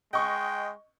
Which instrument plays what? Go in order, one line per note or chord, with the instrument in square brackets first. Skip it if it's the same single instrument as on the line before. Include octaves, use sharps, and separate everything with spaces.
[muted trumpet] G#3 [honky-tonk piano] D#5 C#6 [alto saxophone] G5